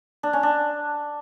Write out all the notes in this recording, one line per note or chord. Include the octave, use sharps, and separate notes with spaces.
D4
C#4
D4